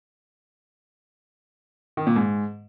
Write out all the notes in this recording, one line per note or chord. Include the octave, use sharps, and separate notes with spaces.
D#3
A#2
G#2